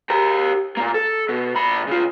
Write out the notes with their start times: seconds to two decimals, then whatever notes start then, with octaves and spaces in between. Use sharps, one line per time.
0.10 G4 A#4
0.77 A#2 A#3
0.94 A4
1.29 B2
1.56 A#2 B5
1.87 C#3 F4